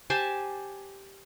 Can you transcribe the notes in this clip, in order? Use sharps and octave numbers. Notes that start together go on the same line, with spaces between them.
G4 C5 G#5 A5